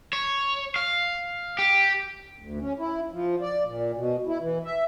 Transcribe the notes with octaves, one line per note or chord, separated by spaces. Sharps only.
C#5
F5
G4
D2
C#4
E4
F3
D5
A#2
B2
E4
E3
E5